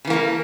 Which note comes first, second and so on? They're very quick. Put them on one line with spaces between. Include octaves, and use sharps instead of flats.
C#3 E3 A#3 A3